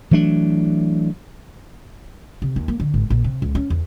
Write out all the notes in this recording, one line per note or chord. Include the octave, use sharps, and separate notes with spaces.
E3 F#3 A3 D4
C3
D#2
A#3
D3
G#1
A#1
C3
C#2
C#4
E2